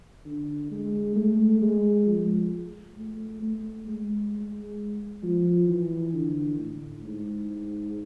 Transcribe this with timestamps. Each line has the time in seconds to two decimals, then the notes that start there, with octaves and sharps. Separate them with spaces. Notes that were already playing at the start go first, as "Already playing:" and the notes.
0.26 D3
0.71 G#3
1.16 A3
1.61 G#3
2.06 F3
2.97 A3
3.42 A3
3.87 G#3
5.23 F3
5.68 E3
6.14 D3
6.59 A2
7.04 G#2